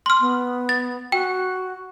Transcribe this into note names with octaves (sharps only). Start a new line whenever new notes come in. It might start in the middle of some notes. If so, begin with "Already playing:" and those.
C6 F6
B3
A6
F#4 G5